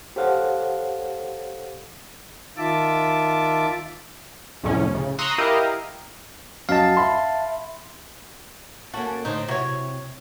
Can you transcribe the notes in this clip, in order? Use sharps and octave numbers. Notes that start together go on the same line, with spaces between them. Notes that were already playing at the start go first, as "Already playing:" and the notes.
G4 A4 C5 C#5 F5 F#5
D#3 F4 E5 A5 D6
C2 F2 A2 C#4
C#3
A#5 C6 C#6 D#6 E6 F#6
E4 G4 A#4 D#5 F5
F#2 D#5 F5 A5
E5 B5 C6
A#3 C#4 F#4 A4
A2 D3 D#4 C5
C3 F#3 E4 C#5